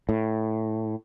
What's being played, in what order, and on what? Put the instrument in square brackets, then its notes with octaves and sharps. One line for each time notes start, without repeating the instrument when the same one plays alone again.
[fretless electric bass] A2